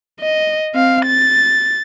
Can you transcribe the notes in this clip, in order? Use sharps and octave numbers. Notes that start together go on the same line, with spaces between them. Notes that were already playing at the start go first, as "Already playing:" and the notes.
D#5
C4 F5
A6